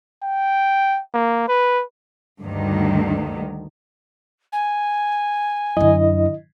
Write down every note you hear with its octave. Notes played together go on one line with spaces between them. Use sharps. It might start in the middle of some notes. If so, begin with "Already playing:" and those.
G5
A#3
B4
D2 G2 D3 D#3
G#5
F#2 D3 E4 D#5